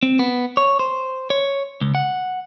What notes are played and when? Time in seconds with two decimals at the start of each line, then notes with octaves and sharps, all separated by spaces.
0.03 C4
0.19 B3
0.57 C#5
0.79 C5
1.30 C#5
1.81 C#2
1.95 F#5